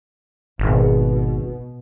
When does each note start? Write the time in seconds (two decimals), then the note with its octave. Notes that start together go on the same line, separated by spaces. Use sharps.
0.59 G#1 B2